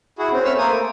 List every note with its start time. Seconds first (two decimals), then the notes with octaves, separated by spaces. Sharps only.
0.19 E4 F#4 G#4
0.32 C4 C#4
0.45 A3 C4 B4 C#5 E6 F6
0.58 A3 A#3 C5 G#5 D#6
0.73 D6